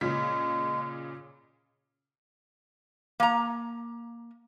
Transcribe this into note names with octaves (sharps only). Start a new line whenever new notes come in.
A#2 C#3 G#3 B6
A#3 A#5